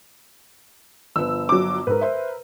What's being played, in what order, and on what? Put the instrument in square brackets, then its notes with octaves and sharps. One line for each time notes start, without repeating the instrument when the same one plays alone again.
[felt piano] G1 F3 B4 [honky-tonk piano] E6
[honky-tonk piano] F#3 D6
[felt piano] G#2 [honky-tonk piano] A#4 B4
[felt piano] C5 E5